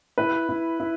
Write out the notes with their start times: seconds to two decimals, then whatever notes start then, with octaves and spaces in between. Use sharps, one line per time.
0.18 E4 B4
0.49 E4
0.80 E4